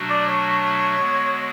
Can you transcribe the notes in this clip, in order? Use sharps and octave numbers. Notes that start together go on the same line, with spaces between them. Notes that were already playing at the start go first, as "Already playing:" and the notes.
Already playing: B2 F#3 A3 D4 F#4
D5
C#5
D3 G#3 B3 F#4